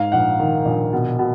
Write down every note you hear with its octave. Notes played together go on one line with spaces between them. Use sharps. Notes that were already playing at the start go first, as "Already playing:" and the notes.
Already playing: G#2 F5
A#1 F#5
D#3
A#1
B2
B2